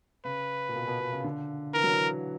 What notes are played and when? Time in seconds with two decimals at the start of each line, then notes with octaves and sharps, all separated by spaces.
0.25 C#3 B4
0.69 A#2
0.75 B2
0.87 B2
1.00 B2
1.13 C#3
1.24 D3
1.74 E3 A#4
1.83 F#3
1.92 E3